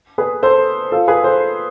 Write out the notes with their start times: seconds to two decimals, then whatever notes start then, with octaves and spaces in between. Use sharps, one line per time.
0.18 G#4 B4
0.43 A4 C5
0.92 F4 A4
1.08 G#4 B4
1.24 A4 C5